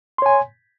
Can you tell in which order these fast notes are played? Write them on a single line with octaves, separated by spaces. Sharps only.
C6 C#5 G#5